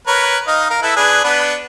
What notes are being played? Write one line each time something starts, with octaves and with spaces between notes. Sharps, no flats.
A#4 B4 C#5
D#4 D#5 F5
A#4 F5
E4 A4 B4
D4 G#4 B4
B3 D4 B4